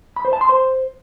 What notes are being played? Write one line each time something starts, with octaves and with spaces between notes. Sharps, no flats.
B5
C5
A5
C6
C5